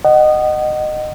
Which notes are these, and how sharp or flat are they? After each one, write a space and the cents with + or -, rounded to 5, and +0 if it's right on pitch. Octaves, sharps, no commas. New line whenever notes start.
D#5 -20 F#5 +25